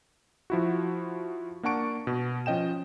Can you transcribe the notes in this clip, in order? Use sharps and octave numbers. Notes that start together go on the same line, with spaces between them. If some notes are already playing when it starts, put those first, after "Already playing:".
F3 E4 F#4
A#3 D4 F#5 A5 C#6 D7
B2
F3 C#4 D#5 G5 E7